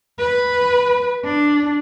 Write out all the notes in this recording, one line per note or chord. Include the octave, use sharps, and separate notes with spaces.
B4
D4